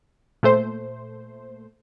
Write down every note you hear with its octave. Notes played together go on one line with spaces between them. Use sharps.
A#2 A3 C5